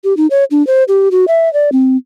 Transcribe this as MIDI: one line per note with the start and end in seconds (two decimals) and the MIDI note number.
0.04 0.16 67
0.17 0.27 63
0.30 0.44 73
0.51 0.65 62
0.67 0.84 72
0.88 1.09 67
1.11 1.25 66
1.28 1.52 76
1.53 1.70 74
1.72 1.97 60